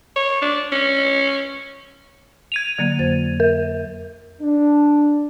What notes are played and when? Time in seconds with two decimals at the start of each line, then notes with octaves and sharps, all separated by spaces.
0.16 C#5
0.42 D4
0.72 C#4
2.52 G#6 D#7 F7
2.79 D3 F#3 A#3
2.99 F2 C5 A6
3.40 A#4
4.42 D4